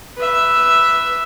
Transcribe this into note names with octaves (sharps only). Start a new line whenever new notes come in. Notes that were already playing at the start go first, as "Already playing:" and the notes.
B4 E5